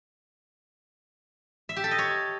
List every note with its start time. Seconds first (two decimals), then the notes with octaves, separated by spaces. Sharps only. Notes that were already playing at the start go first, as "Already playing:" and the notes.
1.69 E5
1.76 G4
1.84 A4
1.91 D#5
1.98 C#5